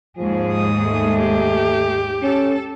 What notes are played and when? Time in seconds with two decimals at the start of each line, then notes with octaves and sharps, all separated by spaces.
0.18 D#2 G#2 F3 G#4
0.53 D#6
0.83 A3
1.19 G4
2.23 C#4 A4